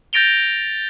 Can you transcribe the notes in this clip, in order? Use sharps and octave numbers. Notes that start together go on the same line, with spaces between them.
G6 A6 A#6 D7 F7 G7